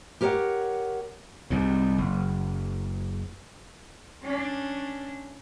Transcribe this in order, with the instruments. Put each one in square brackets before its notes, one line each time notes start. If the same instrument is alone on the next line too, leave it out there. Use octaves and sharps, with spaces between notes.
[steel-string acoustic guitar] G4 A#4 C#5 E5 F#5
[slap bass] C2 G#2
F#1
[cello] C#4 D4